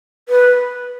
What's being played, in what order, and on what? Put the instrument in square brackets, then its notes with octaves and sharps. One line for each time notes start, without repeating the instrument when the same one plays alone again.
[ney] B4